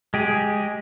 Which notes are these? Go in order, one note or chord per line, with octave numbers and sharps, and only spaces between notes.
G#3 G4 G#4